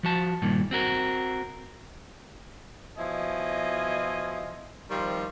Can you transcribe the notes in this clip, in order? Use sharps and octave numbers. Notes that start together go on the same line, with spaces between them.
F3 F#4 A5
G2 A#2 D#3
C4 F#4 A#4
B2 F3 E4 D#5 G#5
D#3 F3 G3 C4